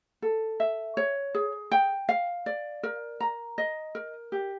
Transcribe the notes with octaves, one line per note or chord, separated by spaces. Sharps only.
A4
E5
C#5
G#4
G5
F5
D5
A#4
A#5
D#5
A#4
G4